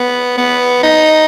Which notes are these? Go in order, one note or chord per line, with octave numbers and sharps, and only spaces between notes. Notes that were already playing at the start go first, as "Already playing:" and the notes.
Already playing: B3
B3
D#4